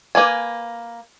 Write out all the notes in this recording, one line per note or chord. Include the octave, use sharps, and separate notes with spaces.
A#3 B4 G#5